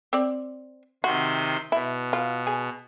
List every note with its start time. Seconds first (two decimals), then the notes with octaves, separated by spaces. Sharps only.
0.13 C4 D5
1.04 C3 D#3 F#4 C6
1.72 B2 E4
2.13 F4
2.47 G#4